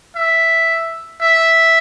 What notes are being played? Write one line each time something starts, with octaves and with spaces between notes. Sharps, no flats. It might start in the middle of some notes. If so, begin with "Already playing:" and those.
E5
E5